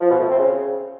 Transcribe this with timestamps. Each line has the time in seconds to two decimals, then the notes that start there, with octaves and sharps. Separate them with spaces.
0.01 F3
0.10 B2
0.20 A3
0.29 C4
0.39 C#3